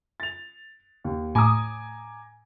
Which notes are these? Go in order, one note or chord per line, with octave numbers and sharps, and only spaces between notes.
A6 F7
D#2
A2 G#5 A#5 D6 D#6